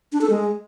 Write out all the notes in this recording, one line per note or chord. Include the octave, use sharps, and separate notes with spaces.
D4
A4
G#3